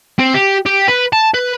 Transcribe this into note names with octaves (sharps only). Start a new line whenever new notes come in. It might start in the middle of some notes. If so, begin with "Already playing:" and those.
C4
G4
G4
B4
A5
B4